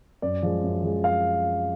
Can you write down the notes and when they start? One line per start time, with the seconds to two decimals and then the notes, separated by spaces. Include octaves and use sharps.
0.22 F#2 D5
0.43 F3 G#3
0.63 F#2
0.83 F3 G#3
1.04 F5